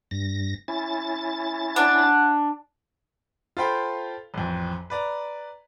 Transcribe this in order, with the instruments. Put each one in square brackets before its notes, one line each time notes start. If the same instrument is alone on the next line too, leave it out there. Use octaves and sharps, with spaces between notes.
[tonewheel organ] G2 A#6
C#4 E4 A6
[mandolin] D4 [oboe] F#5
[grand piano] F4 A4 C5 F5 G5 B5
A1 F2
B4 D5 A#5